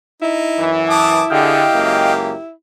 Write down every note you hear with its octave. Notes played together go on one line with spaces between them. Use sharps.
D#4 E4
F#2 E3
A5 D6 D#6
D3 G4 G#4 D#5 F5 G5
C#2 F#2 A#3